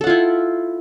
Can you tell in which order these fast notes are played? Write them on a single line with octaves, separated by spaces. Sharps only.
A4 F#5 F4 E4